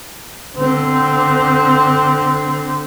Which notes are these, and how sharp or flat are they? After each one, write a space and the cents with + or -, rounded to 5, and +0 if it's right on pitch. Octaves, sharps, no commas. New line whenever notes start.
D3 +0 C4 -15